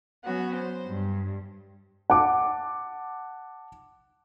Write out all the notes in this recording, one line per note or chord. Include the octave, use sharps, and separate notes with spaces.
F#3 B3 C#4 F#4
C5
G2
F#5 A5 D6